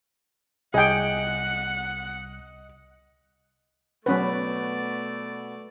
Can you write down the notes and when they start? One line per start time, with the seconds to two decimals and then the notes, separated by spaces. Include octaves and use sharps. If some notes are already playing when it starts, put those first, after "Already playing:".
0.74 C2 G#4 D#5 F#5 G5
4.06 B2 F#3 A3 C#4 B4 D5